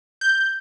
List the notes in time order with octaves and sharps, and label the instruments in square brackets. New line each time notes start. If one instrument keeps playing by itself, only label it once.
[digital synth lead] G6